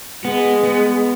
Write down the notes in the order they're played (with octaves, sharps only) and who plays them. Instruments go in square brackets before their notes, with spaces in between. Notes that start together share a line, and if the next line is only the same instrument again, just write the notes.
[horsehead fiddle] G#3 [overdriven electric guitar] B3
[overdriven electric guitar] B3